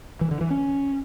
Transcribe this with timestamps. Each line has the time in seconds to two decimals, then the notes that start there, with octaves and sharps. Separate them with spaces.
0.21 E3
0.31 D3
0.41 E3
0.51 C#4